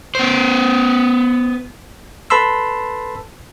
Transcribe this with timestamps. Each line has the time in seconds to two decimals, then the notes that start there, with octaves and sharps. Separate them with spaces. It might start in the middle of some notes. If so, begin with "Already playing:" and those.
0.15 B3 C5
2.30 A4 B4 A5 B5 C6 E6